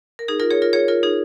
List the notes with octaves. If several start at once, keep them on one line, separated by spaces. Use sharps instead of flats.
A#4
D#4 G#4
F4 A#4
G#4 C#5
F4 A#4
G#4 C#5
F4 A#4
D#4 G#4